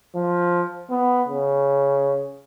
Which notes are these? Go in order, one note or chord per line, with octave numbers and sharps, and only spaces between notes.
F3
B3
C#3